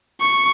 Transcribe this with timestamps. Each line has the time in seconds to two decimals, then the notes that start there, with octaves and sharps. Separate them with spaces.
0.21 C#6